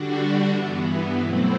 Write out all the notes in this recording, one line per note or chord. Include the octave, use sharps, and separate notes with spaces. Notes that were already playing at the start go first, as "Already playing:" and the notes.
Already playing: D3 G3 D4 F#4
G2 E3 B3
B2 F#3 A3 C4 E4